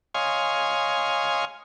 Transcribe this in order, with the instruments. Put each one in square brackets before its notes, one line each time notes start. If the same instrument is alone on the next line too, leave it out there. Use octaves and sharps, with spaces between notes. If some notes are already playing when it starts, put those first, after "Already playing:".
[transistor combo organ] C#5 D#5 F5 G#5 C6